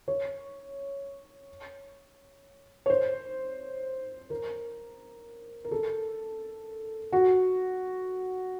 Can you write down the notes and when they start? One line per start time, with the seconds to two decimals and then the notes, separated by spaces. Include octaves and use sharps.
0.08 C#5
2.86 C#5
2.90 C5
4.30 A#4
5.65 A#4
5.71 A4
7.13 F#4